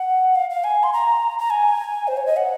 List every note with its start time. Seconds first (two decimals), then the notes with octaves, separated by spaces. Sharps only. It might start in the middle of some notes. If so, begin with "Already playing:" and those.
Already playing: F#5
0.36 F5
0.50 F5
0.64 G#5
0.83 C6
0.93 A#5
1.39 A#5
1.50 G#5
2.08 C5
2.17 C#5
2.26 D#5
2.37 F#5